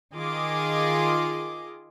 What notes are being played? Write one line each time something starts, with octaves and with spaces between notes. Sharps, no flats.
D#3 F4 G#4 D#5 D6